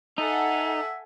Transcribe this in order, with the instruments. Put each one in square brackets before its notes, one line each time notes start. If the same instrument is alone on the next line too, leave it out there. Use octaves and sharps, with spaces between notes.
[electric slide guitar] D#4 [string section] A4 F#5 G#5 [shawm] E5